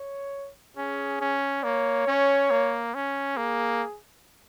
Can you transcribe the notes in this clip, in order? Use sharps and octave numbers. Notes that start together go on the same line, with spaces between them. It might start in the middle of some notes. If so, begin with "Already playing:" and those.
Already playing: C#5
C#4 G#4
C#4
A#3 C#5
C#4
A#3
C#4
A#3 G#4